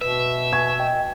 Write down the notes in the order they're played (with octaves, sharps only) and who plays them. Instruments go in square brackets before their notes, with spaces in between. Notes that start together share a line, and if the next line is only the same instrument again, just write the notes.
[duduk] B2 [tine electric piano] B4 [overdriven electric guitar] E5
[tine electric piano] B4 G#5 C#6 [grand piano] G#6
[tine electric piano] D#5 G5